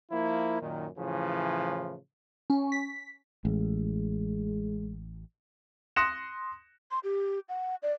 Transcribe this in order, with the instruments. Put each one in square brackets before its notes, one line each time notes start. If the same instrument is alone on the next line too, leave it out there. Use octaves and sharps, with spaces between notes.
[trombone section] F3 A#3 E4
F#2 A#2 D#3
A2 C#3 E3 F3
[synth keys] C#4
B6
[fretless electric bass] A1 [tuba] G#3
[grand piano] C6 D#6 F#6 A#6 C#7 E7
[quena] C6
G4
F#5
D5